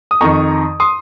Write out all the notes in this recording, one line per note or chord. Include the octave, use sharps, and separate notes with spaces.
D#6
F2 D#3 A#5 C#6
C6 D#6